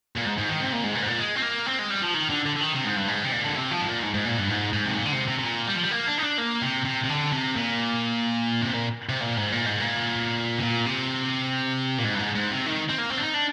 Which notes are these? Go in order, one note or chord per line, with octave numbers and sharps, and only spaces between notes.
A#2
G#2
G#2
D#3
C3
A#2
G#2
A#2
G#2
A#2
G#3
C4
A#3
C4
G#3
G3
F3
D#3
D3
D3
D3
D#3
C3
G#2
G2
G#2
C3
A#2
D3
C3
F3
G#2
A#2
G#2
G#2
A#2
G2
G#2
G#2
C3
A#2
D3
C3
C3
C3
A#2
G3
F3
G3
A#3
D4
D#4
D4
A#3
C3
C3
C3
D3
C3
A#2
C3
A#2
C3
A#2
G#2
A#2
G#2
A#2
C3
A#2
C3
A#2
G#2
G2
G#2
G#2
C3
D#3
C4
A#3
C4
D4
D#4
D4